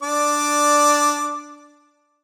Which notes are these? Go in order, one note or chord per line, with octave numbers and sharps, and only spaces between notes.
D4 D5 D6